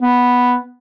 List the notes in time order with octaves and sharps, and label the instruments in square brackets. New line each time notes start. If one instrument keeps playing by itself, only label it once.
[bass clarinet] B3